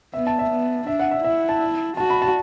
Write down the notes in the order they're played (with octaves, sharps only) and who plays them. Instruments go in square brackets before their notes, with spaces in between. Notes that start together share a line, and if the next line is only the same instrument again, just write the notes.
[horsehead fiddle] B3 [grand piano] E5
[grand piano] A5
E5
[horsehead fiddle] B3
[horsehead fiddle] D4 [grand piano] E5
[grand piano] F#5
E5
[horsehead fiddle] E4 [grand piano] E5
[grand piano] A5
[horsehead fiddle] F#4 [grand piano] A5
[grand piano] B5
A5